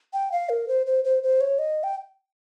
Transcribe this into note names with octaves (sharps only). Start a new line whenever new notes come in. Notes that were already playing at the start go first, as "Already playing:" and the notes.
G5
F5
A#4
C5
C5
C5
C5
C#5
D#5
G5